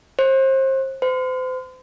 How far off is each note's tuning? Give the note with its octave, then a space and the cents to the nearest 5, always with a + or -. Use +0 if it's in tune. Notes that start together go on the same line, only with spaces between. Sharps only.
C5 +30
C5 -35